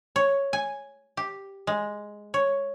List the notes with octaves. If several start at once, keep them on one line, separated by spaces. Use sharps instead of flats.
C#5
G#5
G4
G#3
C#5